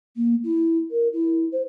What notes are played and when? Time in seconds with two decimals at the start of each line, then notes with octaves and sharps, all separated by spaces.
0.16 A#3
0.43 E4
0.90 A#4
1.12 E4
1.52 C5